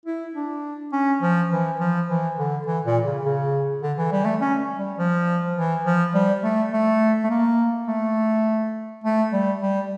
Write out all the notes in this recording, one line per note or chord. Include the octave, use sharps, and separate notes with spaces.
E4
D4
C#4
F3
E3
F3
E3
D3
E3
A#2
C#3
C#3
D3
E3
G3
A3
C#4
G3
F3
E3
F3
G3
A3
A3
A3
A#3
A3
A3
G3
G3